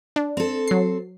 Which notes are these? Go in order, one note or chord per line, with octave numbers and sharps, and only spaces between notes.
D4
C4 A4
F#3 C7